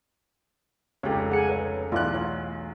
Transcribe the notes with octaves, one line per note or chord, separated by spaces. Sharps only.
F1 C#2 G4 C#5
G#4 F#5 G#5 C#7
B4 C#5
B1 E2 A3 E4 F4 D5 F#6
F4 C#5